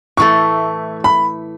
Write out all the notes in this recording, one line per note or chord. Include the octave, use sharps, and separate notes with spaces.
A2 E3 A3 C#6
B5